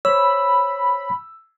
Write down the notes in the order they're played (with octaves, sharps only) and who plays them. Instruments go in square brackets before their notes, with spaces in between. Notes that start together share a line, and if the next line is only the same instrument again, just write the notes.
[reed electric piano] C5 C#5 [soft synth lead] B5 [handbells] E6